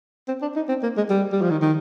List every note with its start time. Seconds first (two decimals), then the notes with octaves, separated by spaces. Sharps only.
0.28 C4
0.42 D4
0.56 D#4
0.69 C4
0.83 A#3
0.97 G#3
1.10 G3
1.32 G3
1.42 F3
1.50 D#3
1.62 D#3